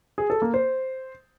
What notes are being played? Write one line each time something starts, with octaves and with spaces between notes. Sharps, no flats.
G#4
A4
A#3
C5